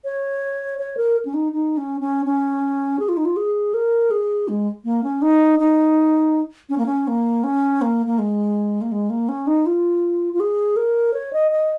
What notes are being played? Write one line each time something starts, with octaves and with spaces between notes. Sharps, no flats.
C#5
C#5
A#4
C#4
D#4
D#4
C#4
C#4
C#4
G#4
F4
D#4
F4
G#4
A#4
G#4
G#3
A#3
C#4
D#4
D#4
C#4
A#3
C#4
A#3
C#4
A#3
A#3
G#3
A#3
G#3
A#3
C#4
D#4
F4
F4
G#4
A#4
C#5
D#5
D#5